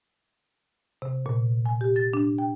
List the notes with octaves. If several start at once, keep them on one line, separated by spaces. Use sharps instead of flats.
C3
A#2
G#5
G4
A6
D4
G5